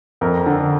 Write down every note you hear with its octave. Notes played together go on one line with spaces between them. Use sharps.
F2 A#4
D3